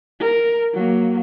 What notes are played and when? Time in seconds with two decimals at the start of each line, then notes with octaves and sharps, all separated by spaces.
0.20 A#4
0.74 F#3 A#3